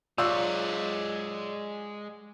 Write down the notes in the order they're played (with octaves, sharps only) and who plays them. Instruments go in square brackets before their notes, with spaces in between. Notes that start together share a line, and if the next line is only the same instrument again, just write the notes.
[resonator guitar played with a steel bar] F#3 F4 [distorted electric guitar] G#3 F#5 [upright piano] D5 E6 G6